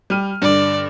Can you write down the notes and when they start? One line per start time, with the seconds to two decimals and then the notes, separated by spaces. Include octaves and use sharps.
0.10 G3 F6 D#7
0.42 G2 D3 D5